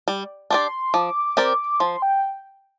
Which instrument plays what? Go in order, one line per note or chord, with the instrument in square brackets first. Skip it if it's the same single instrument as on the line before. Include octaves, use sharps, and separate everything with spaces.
[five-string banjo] G3
[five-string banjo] D4 G4 D5 [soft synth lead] C6
[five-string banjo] F3 [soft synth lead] D6
[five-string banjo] C4 G4 A#4 D5
[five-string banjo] F3 [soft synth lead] C6
[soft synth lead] G5